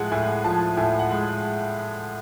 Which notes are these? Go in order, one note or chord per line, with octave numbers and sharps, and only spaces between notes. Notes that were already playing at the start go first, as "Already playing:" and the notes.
Already playing: A2 F3 G#3 F#5 G#5
A2 G#5
F3 A5
A2 G#5
F#5
G#3